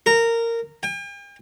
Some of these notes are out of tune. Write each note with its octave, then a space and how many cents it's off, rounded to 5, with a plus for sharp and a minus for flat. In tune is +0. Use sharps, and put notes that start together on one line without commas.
A#4 -15
G5 +45